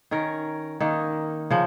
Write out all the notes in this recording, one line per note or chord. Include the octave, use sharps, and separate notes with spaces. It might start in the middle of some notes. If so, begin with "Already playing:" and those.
D#3 C#4 A#4
D#3 A#3 D#4
C#3 F3